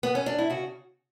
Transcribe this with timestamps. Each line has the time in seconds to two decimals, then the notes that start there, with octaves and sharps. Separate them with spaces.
0.03 B3
0.15 C#4
0.26 D4
0.38 E4
0.50 C#3 F#4